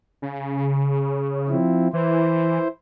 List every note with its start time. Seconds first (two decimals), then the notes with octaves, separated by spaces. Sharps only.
0.22 C#3
1.48 F3 C4 E4
1.93 E3 E4 C5